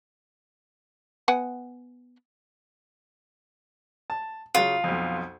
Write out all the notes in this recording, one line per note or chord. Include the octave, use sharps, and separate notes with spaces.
B3 F#5 G#5
A5
C#3 F#3 F4
B1 F2